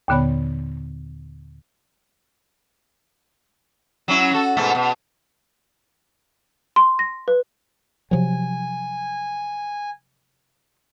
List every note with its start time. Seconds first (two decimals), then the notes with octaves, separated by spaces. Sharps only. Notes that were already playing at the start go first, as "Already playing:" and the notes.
0.08 D#2 A#2 D3 B3 C#5 B5
4.08 F#3 C#4 E4
4.31 F#4 A4
4.57 G#2 B2 A3
4.75 B2
6.76 C6
6.99 A#6
7.28 B4
8.11 C3 F3 F#3 G#5